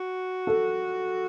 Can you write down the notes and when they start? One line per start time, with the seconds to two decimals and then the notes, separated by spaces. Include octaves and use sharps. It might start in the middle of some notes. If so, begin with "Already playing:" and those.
Already playing: F#4
0.47 A4